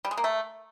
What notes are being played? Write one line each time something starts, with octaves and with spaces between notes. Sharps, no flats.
G3
G#3
A#3
A3